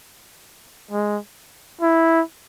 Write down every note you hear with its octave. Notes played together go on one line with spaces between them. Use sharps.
G#3
E4